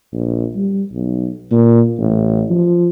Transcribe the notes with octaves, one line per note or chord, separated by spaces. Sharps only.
A#1
G3
B1
A#2
A1
F3